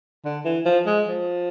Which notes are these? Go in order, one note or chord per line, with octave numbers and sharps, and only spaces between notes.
D3
E3
F3
G#3
F3